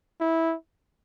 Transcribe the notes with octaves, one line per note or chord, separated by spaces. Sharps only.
E4